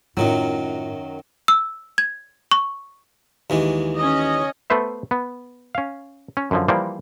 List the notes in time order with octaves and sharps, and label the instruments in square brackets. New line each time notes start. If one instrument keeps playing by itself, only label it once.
[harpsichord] F#2 D#3 F#3 [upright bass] A2 F4
[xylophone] E6
G#6
C#6
[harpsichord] D#2 E3 G#3
[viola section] C#4 D#5
[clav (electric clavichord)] A3 B3 B4 C5 E5
B3
C#4 F5
C#4
F#2 D3 F3
E3 F3 G3 A#3 C5 D5